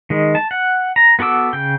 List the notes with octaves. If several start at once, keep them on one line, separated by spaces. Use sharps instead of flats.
D#3 G#3
A5
F#5
A#5
B3 F#4 A4 D6 E6
C#3 G5